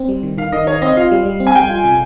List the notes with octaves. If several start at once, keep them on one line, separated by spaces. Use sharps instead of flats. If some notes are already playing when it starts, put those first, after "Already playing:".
Already playing: C4
G3
D#3
D#3 F5
D#3 D#5
D#4 C#5
C4 D#5
F4 F5
G3
G3
C4
G#5
G3 G5
F4
C3